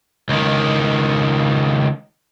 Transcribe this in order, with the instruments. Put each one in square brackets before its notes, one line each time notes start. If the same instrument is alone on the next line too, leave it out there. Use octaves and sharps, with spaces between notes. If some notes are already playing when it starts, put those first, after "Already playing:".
[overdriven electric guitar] C#2 D#3